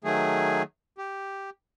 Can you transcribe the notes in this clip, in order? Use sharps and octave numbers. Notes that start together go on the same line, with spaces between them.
D#3 F#3 A3 G#4
G4